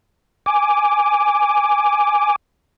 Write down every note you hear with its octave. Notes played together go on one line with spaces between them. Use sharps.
G#5 D6